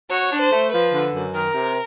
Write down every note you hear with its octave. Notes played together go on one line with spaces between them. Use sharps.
F#4 C#5
D4
C5
A3
F3 B4
D3
F#2
D#3 A#4
C3